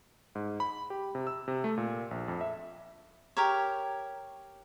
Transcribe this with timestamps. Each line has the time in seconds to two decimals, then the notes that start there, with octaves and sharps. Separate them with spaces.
0.35 G#2
0.60 B5
0.90 G4
1.15 C3
1.27 E6
1.48 C3
1.64 A3
1.77 A#2
2.11 A#1
2.28 F2
2.41 E5
3.37 G4 A#4 C#5